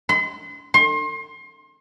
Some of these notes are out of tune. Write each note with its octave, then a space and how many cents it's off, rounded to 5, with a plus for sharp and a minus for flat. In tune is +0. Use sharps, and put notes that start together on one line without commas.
C6 -45
C6 +35